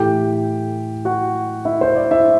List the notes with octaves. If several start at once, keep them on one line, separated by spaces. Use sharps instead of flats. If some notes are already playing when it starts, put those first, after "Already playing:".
Already playing: A2 E3 A3 G4 G5
F#4 F#5
E4 E5
C5
D5
E4 E5